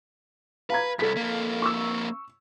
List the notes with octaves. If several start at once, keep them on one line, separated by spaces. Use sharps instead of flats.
B4 F5 A#5 G#6
C2 F#2 A4 B6
F2 A#3
C#6 E6